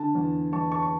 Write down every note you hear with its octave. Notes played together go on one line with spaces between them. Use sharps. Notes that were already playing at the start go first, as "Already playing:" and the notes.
Already playing: D3 A5
E2
E2 A5 C#6
A5 C#6
C#6